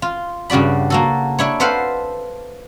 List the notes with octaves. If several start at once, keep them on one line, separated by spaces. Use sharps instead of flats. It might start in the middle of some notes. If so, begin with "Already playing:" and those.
F4
G2 C#3 F#4 D5 B5
A#3 F#4 A4
D4 E4 C#5
A4 B4 C5 F5 F#5